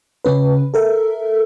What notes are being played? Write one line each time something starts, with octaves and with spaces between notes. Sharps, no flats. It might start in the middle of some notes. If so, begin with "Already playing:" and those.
C#3 C#4 B4
A4 A#4 E5